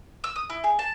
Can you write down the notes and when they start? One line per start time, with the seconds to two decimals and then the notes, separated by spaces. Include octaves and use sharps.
0.24 E6
0.36 D#6
0.50 E4
0.64 G#4
0.79 A5